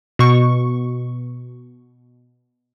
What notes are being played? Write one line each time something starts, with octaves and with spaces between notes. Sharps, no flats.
B2 C#6